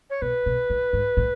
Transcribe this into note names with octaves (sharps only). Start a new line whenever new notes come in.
C#5
B2 B4
B2
A2
G#2
A2